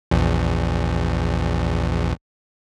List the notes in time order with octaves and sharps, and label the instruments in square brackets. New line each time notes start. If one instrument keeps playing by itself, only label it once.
[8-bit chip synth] A#1 E2